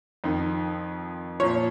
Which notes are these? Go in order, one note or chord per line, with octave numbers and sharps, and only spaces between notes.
F2 D#3
A#2 F3 C#5